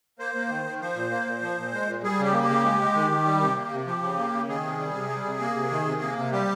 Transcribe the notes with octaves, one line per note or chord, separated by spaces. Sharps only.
A#3 C5
A#3
D#3
D#3
F3 C5
A#2
A#3
A#2
F3
A#2
G#3
A#2
G3 G#4
C#3 G4
A#3
G4
C#3
G#3
G#3
D#3
D#3
G3
C3
A#3
C3
F3 G4
C#3
A#3
C#3
D#3 G#4
C3
G3
C3
G3
C3
A#3
C3
D#3
C3
A#3
C3
G3 G4